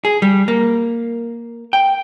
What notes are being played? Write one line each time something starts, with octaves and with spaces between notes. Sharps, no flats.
G#4
G3
A#3
G5